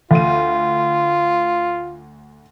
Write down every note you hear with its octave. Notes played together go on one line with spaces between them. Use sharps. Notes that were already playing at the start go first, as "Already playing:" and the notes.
D2 F4 D#7